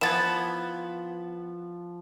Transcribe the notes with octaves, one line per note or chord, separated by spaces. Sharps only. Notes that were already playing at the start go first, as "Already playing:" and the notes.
E3 F3 B3 G#6 A6 E7